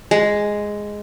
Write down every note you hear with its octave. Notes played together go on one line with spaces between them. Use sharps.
G#3